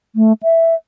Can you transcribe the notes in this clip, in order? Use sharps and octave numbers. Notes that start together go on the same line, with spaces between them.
A3
E5